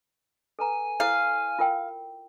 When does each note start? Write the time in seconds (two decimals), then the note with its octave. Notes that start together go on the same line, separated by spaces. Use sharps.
0.59 A4 B4 G#5 A#5
1.00 E4 A4 C5 F5
1.59 F4 A#4 G5